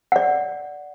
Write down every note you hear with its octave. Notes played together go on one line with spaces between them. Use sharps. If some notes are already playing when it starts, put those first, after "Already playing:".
D5 F#5